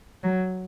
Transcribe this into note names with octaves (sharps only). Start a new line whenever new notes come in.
F#3